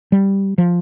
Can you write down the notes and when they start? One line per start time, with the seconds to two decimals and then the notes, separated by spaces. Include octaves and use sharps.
0.12 G3
0.58 F3